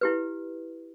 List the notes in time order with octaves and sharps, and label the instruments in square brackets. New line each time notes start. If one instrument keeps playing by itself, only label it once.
[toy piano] E4 G4 B4